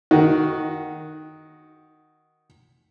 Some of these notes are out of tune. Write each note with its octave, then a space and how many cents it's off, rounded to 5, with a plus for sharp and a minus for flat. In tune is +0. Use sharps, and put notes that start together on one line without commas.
D#3 +0 F#4 +0